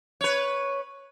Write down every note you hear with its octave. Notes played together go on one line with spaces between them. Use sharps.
B4 C#5